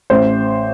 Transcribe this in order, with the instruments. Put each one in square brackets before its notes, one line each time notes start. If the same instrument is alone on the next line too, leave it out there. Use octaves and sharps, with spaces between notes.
[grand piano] A1 C5